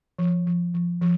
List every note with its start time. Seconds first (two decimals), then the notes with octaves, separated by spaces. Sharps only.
0.19 F3
0.47 F3
0.74 F3
1.01 F3